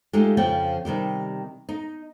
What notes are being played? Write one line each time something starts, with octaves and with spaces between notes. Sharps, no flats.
G#3 A3 D#4 F4 G4
F2 C#3 F3 G5
C3 D#3 G3 G4
D#4